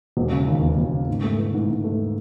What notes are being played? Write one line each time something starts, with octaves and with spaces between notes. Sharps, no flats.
E1
C#3
D#2
E1
E1
C#3
G#2
A3
E3
G#2
G#2
A3